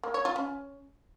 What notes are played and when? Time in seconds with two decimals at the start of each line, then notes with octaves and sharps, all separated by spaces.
0.03 A#3
0.14 C#5
0.25 F4
0.36 C#4